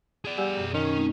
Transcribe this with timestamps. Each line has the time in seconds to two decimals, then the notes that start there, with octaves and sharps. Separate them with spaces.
0.25 G#4 D5
0.38 G3 F#5 G#5 E6
0.58 F#2 B2
0.74 D#3 C#4
0.96 A3 C4 D#4